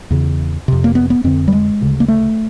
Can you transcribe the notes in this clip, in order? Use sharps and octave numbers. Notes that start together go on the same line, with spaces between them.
E2 C#3
F2 C3
A#3
B3
B3
F2 D3 C4
G3
G#3
D2 C#3
A#3
A3